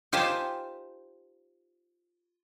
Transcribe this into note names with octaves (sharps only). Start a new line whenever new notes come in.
D#4 F4 G4 C5 G#5 A5